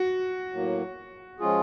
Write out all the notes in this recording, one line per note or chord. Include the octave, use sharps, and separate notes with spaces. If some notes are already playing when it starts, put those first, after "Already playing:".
Already playing: F#4
A2 F#3 A#3
F3 G#3 C#4 F4 G#4